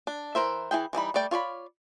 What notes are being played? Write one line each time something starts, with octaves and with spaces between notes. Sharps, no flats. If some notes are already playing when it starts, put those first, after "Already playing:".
D4
E3 A#4 C5 E5
E3 E4 G#4 G5
E3 G3 D#4 B5
G3 A3 D5 G5
F4 C#5 D5 B5